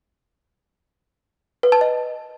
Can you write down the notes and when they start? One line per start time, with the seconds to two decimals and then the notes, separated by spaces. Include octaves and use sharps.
1.63 B4
1.72 A5
1.81 D#5